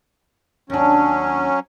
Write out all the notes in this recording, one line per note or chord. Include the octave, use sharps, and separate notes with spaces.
D#2 F#3 C#4 D4